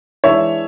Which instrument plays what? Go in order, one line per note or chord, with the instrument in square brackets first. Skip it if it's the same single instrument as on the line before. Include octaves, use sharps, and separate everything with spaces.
[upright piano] E3 G#3 D4 C#5 E5